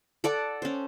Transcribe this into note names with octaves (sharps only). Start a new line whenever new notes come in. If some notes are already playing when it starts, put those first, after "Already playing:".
A4 D5 F#5
C#4 C5